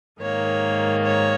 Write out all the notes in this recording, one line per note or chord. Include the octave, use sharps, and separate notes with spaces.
G#2 D#3 A#3 C#5
C#5